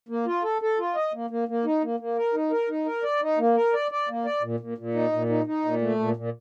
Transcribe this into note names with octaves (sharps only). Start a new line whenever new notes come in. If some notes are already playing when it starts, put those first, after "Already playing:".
A#3
F4
A4
A4
F4
D#5
A#3
A#3
A#3
D#4
A#3
A#3
A#4
D#4
A#4
D#4
A#4
D5
D#4
A#3
A#4
D5
D5
A#3
D5
A#2
A#2
A#2
D#4
A#2
D#4
D#4
A#2
A3
A#2
A#2